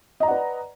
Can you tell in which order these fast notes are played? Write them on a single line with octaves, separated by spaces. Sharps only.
D#5 A#5 D5 F#5 B4